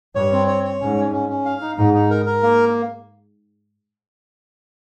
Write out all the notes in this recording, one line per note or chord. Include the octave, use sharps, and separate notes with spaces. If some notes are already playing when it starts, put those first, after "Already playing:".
G2 C#5
C4
C#5
C#5
G#2 C#4
C#4
C#4
C#4
F5
D#4
G#2 D#4
D#4
A#4
A#4
A#3